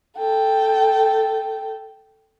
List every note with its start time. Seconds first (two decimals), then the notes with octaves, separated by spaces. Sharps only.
0.18 A4 G5